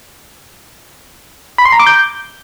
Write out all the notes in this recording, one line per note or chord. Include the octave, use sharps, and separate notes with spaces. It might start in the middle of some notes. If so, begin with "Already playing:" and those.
B5
C6
A#5
D6
G6